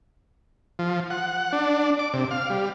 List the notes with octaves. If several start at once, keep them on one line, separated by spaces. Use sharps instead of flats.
F3
F#5
D4
D6
C3
F5
G3